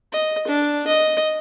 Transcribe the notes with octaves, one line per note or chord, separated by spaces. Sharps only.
D#5
D4
D#5